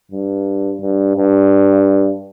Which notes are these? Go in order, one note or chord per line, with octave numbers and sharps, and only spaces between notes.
G2
G2
G2